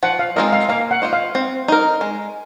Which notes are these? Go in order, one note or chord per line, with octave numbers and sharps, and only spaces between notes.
F3 F#5
F5
G#3 C4 F4 A#4 D#5
F5
A#3 F5
F#5
F4 C5 D#5
F5
C4
D#4 A#4
G#3